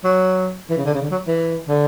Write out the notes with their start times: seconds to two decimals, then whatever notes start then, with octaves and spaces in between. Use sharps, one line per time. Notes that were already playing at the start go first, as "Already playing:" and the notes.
0.04 F#3
0.69 E3
0.78 C#3
0.85 D3
0.94 C#3
1.02 D3
1.10 F#3
1.27 E3
1.68 D3